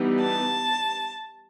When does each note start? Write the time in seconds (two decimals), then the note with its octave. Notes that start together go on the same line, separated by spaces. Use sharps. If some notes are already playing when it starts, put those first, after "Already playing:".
Already playing: E3 G3 B3 D#4
0.20 A5